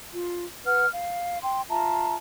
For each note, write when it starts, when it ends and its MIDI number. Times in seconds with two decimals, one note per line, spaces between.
0.13 0.45 65
0.66 0.86 71
0.66 0.86 78
0.66 0.86 89
0.91 1.38 77
1.41 1.61 79
1.41 1.61 84
1.70 2.15 65
1.70 2.15 76
1.70 2.15 81
1.70 2.15 82